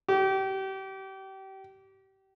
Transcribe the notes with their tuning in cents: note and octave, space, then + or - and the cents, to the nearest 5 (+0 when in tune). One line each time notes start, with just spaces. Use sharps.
G4 -30